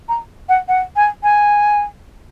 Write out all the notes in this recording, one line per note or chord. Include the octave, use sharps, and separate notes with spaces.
A#5
F#5
F#5
G#5
G#5